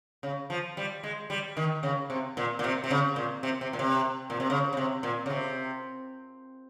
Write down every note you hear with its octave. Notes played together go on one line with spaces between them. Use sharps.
C#3
F3
G3
G#3
G3
D#3
C#3
C3
A#2
A#2
C3
C3
C#3
A#2
C3
C3
A#2
C3
A#2
C3
C#3
C#3
C3
A#2
C#3
C3